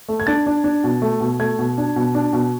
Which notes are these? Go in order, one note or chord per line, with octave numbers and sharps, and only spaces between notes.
A3
G#6
D4 A6
D4
D4
B2
A3
B2
A3 G#6
B2
D4
B2
D4
B2